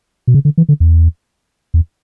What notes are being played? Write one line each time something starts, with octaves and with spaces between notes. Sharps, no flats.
B2
C#3
D3
E3
D3
E2
E2